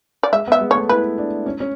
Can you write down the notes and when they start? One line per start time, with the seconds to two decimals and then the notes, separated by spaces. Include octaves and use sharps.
0.23 D5
0.32 G#3 E5
0.48 B3
0.52 E5
0.61 G#3
0.71 A3 C#5
0.89 E4 B4
1.18 D4
1.46 C#4
1.60 C#4